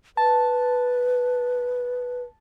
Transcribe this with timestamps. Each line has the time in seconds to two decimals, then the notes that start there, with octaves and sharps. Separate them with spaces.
0.17 B4 A5